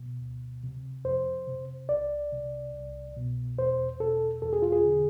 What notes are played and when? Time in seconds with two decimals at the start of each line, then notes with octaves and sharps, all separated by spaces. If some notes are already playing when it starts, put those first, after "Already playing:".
Already playing: B2
0.21 D2
0.63 C3
1.04 F2 C5
1.48 C3
1.89 C2 D5
2.32 C3
2.74 C2
3.17 B2
3.58 E2 C5
4.00 B2 A4
4.42 E2 A4
4.53 G#4
4.62 F4
4.72 G#4
4.85 D3